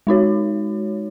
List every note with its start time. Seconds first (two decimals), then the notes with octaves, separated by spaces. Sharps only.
0.07 G#3 D#4 F#4 C#5